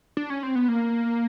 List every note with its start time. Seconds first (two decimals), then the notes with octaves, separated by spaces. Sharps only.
0.17 D4
0.30 C#4
0.43 C4
0.55 B3
0.68 A#3